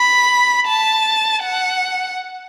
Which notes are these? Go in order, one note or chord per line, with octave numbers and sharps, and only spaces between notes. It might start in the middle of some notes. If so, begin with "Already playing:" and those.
Already playing: B5
A5
F#5